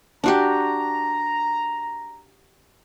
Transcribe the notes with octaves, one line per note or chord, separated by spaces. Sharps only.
D4 F#4 G4 A#5